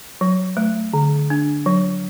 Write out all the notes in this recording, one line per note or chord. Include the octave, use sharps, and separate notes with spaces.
F#3
A3
D3
D4
F#3